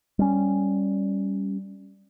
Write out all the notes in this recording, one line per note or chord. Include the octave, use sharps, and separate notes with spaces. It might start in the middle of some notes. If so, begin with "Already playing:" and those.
G3 C#4